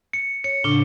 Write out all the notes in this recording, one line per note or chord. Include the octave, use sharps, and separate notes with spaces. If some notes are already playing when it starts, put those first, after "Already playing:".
C#7
C#5 C#7
A2 C#3 D4 G7